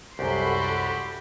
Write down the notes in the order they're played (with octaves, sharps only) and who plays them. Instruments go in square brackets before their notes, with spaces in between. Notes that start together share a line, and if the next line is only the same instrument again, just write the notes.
[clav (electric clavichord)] C2 F#2 [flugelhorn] F#4 [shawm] G4 [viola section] A4 B5 C6